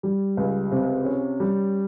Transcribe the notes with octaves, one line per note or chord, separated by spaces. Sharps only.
G3
C#2
C3
C#4
G3